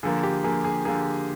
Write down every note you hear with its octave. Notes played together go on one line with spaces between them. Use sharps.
D3 F3 A#3 G#4
G4
D3 F3 A#3 G#4
G#4
D3 F3 A#3 G#4